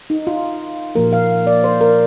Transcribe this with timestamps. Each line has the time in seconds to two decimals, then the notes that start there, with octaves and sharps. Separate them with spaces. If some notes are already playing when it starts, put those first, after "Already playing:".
0.10 D#4
0.27 F4
0.95 A#2 F3 A#3 A#4
1.13 F5
1.47 D5
1.64 C5
1.81 A#4